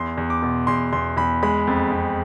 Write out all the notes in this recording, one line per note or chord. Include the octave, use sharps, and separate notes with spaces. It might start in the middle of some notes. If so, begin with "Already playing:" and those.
Already playing: E2 C6
E2
D6
B2
E2 C6
E2 C6
E2 B5
G#3 B5
F2
F2